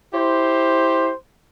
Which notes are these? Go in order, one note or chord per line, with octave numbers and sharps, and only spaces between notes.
E4 G4 C5